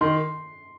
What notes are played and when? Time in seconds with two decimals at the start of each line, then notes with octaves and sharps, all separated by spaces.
0.01 D#3 C6